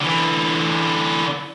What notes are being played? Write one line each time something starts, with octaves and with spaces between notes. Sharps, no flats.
D3 E3